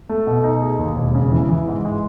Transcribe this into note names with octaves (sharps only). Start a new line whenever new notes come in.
A3
B2
D#4
G#4
D#2
E1
C#3
E3
E3
G#2
G#3